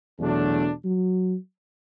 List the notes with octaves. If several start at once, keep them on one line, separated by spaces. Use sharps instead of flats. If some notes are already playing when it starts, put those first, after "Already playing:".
E2 B2 F#3 A3 D4
F#3